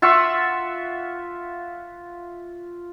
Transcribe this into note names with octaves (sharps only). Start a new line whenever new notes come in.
F4 E5 F#5 C#6